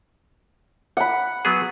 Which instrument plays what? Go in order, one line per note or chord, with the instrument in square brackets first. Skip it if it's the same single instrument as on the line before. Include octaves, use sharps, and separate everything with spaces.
[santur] F#5 B5
[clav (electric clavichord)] F#3 B3 G#4